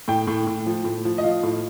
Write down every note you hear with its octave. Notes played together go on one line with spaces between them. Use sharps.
A2 G5
A2
A2
F3
A2
F3
D#5
F3 F5
A2